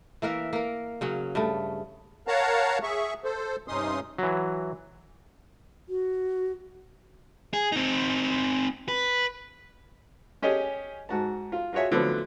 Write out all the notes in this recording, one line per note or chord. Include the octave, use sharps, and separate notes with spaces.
E3 A#3 A#4 E5
A#3 A#4
C#3 F#3 C#4
G2 C#3 A3
A#4 C#5 F5 F#5 A5 A#5
G#4 E5 C#6
A4 C5
G2 C3 C#4 D#4 C6 D#6
E3 F#3
F#4
G#4
C4 D#4
B4
C#4 G4 G#4 D#5
G#2 F#4 A5
F4
F4 F#4 G#4 C#5 E5
A2 D3 F3 F#3 B3 C4